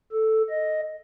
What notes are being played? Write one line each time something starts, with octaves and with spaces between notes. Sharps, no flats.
A4
D#5